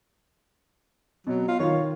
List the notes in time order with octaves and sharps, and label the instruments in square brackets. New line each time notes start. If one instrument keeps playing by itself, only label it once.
[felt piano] B2 [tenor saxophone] F#3
[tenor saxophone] F4
[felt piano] D#3 F4 [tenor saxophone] C#5